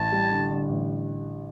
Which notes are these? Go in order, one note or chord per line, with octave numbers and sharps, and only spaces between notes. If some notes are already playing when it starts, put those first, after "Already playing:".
Already playing: A1 A5
G3
D3
D3
A1